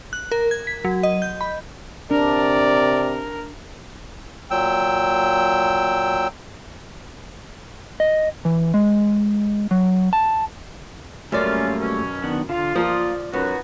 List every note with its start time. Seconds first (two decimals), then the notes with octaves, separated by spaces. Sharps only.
0.13 F#6
0.32 A#4
0.51 G#6
0.67 B6
0.84 F#3
1.03 D#5
1.22 G6
1.41 B5
2.11 C3 D4 A#4 D5
4.51 A#2 F#3 G5 E6
8.00 D#5
8.45 E3
8.74 G#3
9.71 F#3
10.13 A5
11.32 F#2 G3 A3 A#3 C#4 F4 D5
11.81 B2 C#4
12.24 D#3 B3 D4
12.49 D3 F4 F5
12.75 F3 A#3 D5 D#6
13.33 F#2 B3 D#4 F#4